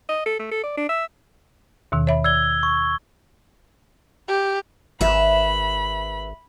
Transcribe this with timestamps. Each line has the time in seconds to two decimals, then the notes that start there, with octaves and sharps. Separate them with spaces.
0.09 D#5
0.26 A4
0.39 A3
0.51 A4
0.63 D5
0.77 D4
0.89 E5
1.92 D#2 B2 D#3
2.07 C#5 E5 B5
2.24 D5 E6 G#6 G7
2.63 C#6
4.28 G4
5.01 G#1 B4 E5 B5